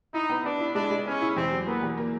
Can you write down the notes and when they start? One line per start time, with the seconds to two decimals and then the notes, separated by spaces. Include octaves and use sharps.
0.14 D#4 E4
0.30 B3
0.45 B3 D4
0.60 E4
0.75 G#3 D4
0.90 G#3
1.06 B3 C#4
1.22 E4
1.36 E2 C4
1.52 F#3
1.67 A#3 B3
1.82 E2
1.97 A#3